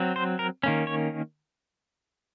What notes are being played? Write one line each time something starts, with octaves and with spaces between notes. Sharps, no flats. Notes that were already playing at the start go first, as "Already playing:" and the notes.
Already playing: F#3 C4
C5
A#4
D#3 A#3 C#4
C#5